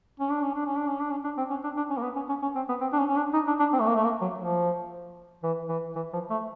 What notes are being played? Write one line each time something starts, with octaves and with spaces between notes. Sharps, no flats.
C#4
D4
C#4
D4
C#4
D4
C#4
D4
C#4
D4
C4
C#4
D4
D4
C#4
A#3
B3
C#4
C#4
C#4
C4
B3
C4
D4
C#4
C#4
D4
D#4
D4
D4
C4
A3
A#3
A3
A#3
F#3
F3
E3
E3
E3
F3
A3